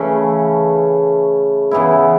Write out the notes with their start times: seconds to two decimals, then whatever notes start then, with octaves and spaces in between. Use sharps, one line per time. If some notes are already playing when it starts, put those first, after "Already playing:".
Already playing: C#3 E3 A3 C#4
1.71 C#3 E3 B3 E4